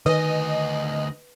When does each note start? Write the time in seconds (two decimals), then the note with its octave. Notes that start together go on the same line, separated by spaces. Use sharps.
0.06 D2 D#3 B4 D#5 G#5